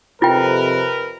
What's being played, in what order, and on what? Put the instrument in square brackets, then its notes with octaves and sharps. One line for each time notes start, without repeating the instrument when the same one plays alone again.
[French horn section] F2 C3 [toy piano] F4 G5 [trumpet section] A#4 B4